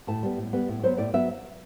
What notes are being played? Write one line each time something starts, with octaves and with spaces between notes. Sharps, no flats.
A2 A5
G3 B3
A2
G3 B3
A2
F#3 B3 C5
A2 D5
F#3 B3 E5